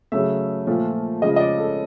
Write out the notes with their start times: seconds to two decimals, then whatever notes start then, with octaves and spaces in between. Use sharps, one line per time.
0.12 C#3 F#3 A3 E5
0.67 A#2 F3 A3
1.22 C#3 F3 G#3 D#5
1.36 D#5
1.40 D5
1.58 A4